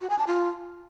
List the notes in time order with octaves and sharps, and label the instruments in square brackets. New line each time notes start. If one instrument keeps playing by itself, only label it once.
[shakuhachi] F#4
G#5
A5
F4